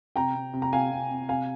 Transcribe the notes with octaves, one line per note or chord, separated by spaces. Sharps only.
C3 G5 A#5
C3
C3
A#5
C3 F5 G#5
C3
C3
C3 F5 G#5